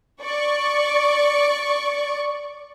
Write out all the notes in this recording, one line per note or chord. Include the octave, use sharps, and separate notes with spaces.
D5 C#6